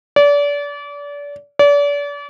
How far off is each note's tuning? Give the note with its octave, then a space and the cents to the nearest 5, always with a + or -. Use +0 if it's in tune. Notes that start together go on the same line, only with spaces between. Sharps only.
D5 -30
D5 -35